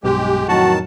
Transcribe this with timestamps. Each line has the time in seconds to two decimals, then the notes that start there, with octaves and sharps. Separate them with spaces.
0.04 B1 G2 B2 G#3 G4
0.48 F2 A2 D#3 F#3 F#4 A5